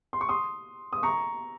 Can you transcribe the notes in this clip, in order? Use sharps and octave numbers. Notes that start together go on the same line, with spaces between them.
C6
C#6
C6 D#6
D#6
A#5 C#6